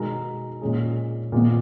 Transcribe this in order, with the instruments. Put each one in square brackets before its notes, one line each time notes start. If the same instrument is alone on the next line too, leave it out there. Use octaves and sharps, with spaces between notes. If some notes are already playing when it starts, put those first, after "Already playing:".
Already playing: [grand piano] B2 G#3 D#4 F#4 A#4
A#2 G#3 C#4 G#4
A#2 G#3 B3